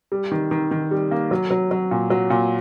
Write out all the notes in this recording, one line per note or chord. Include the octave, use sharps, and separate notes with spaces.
G3
D#3
D#3
D#3
G3
A#3
F#3
F#3
F#3
A#2
F#3
A#2